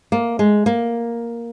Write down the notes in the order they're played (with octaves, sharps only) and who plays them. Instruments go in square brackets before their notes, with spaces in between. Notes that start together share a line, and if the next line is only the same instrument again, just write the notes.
[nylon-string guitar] A#3
G#3
A#3